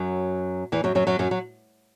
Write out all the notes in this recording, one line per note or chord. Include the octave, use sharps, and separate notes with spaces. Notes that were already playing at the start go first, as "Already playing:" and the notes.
Already playing: F#2 F#3
E2 E3
F#2 F#3
F#2 F#3
F#2 F#3
F#2 F#3
F#3